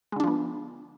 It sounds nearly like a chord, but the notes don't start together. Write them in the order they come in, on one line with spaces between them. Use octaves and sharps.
G#3 D3 D4 F3 B3